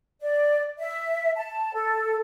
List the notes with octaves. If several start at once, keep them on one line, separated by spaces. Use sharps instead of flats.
D5
E5
A5
A4